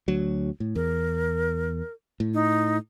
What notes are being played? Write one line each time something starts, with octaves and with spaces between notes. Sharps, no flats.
D2 F#3
A2
E2 A#4
A2
D#4